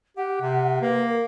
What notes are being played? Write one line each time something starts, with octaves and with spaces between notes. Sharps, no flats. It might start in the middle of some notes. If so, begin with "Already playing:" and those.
G4 F#5
C3
A#3 B4
A#4